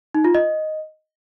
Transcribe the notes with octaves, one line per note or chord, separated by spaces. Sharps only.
D#4
F4
D#5